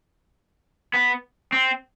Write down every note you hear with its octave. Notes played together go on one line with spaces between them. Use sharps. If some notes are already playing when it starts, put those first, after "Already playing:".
B3
C4